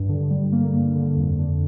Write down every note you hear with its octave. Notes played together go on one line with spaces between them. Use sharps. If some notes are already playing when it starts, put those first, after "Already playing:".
Already playing: G2
D3
G3
A#3
G2
D3
F2
D3